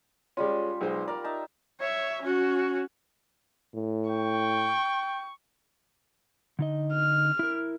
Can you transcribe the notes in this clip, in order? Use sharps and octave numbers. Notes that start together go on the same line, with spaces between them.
G3 G#3 C#4 F4
B1 G#3 C5
A#4 D5 F5
D#4 E5 A5
C#5 E5
C#4 F#4
A2
G5 C#6
D3 D#4 D#5
F6
E4 A#4